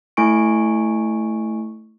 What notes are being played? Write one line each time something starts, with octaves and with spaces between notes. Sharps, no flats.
A3 E4 G#5 C#6 D7